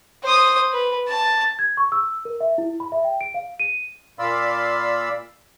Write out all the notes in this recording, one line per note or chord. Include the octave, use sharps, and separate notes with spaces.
C5 D#6
B4
A5
G#6
C#6
E6
A#4
E5
E4
B5
E5
G5
D7
F5
D#7
A#2 D5 F5 B5 C6 E6